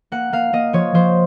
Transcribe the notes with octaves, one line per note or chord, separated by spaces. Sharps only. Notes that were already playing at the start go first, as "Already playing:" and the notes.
A#3 F#5
A#3 F5
A#3 D#5
F3 C#5
F3 C5